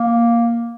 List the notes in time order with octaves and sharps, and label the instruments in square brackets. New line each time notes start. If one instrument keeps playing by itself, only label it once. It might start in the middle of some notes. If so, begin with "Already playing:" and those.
Already playing: [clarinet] A#3